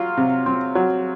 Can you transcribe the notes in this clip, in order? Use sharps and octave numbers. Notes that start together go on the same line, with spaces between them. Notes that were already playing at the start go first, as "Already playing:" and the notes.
Already playing: F#3 F4
C3
C4
F#3